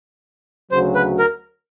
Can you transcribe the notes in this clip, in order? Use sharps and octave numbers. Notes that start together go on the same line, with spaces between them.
D2 C#3 F#3 C5
B4
A#4